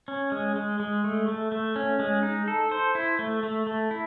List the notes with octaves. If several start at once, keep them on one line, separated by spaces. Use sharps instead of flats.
C#4
G#3
G#3
G#3
A3
A3
A3
C#4
G#3
D#4
A4
C5
E4
A3
A3
A3
E4